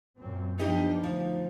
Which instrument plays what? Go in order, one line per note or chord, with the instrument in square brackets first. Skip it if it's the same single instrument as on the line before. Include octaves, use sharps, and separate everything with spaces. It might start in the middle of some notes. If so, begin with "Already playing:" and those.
[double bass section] F#2 A#2 C4
[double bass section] F3 B3 [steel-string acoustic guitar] D4 G4 D#5 [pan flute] D#4
[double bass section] D2 [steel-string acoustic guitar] F3